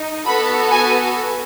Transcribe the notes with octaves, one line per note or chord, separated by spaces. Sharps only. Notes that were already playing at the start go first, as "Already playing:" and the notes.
Already playing: D#4
B3 F#4 A4 B5
G#5